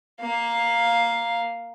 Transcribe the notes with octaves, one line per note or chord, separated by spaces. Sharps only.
A#3 F5